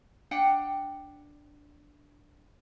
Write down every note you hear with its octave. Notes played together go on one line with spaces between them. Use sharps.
D4 F#5 G5